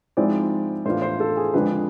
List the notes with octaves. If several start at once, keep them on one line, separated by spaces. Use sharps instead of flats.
G#2 F3 G#3 C4 E4 D5
A2 E3 B3 D4 F4 C5
C5
A4
G#4
F2 D3 F3 G#3 D4 B4